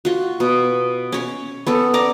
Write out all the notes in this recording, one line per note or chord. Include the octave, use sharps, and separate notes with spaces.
F4 F#4
B2
C#4 C#5
B3 C#4 A4
D5 A#5 D6